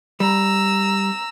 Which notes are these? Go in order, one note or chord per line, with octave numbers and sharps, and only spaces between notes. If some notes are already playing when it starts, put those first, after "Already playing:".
G3 A#5 E6